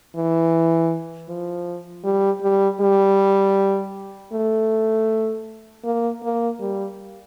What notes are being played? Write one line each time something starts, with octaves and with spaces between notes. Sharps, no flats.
E3
F3
G3
G3
G3
A3
A#3
A#3
G3